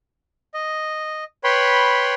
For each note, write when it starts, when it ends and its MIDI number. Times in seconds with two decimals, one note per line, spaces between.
0.54 1.24 75
1.44 2.15 71
1.44 2.15 73
1.44 2.15 79
1.44 2.15 83
1.44 2.15 84